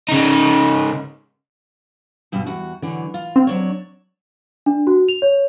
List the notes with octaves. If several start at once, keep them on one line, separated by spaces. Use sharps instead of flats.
C#3 D#4
E2 G2 B2
E2 F#4
D3 E3 F#3
F4
C4
F#3 D4 C#5
D4
F#4
F7
C#5